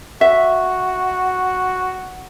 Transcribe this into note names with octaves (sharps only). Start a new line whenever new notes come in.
F#4 E5